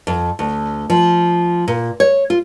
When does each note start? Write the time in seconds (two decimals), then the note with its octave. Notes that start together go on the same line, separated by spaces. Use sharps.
0.07 F2
0.39 D2
0.90 F3
1.68 A#2
2.00 C#5
2.30 F4